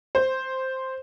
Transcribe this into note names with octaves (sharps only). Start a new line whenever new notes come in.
C5